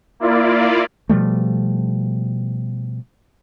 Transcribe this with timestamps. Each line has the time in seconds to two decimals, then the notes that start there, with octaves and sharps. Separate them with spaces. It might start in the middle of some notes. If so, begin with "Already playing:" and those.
0.20 A#3 E4 F4 D5
1.09 B2 F3 G3 A3